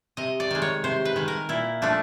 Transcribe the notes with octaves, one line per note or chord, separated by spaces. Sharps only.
C3 D#5
D5
D#3 G#3
C#5
C3 C5
B4
D#3 G#3
A#4
A#2 E4
F3 A3 D4